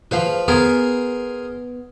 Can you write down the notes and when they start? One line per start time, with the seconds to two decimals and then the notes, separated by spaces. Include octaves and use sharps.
0.11 F3 G#4 B4 C5 F5
0.48 B3 G#4 A#4 C5